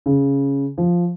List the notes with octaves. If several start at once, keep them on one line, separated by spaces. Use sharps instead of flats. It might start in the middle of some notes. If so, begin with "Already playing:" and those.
C#3
F3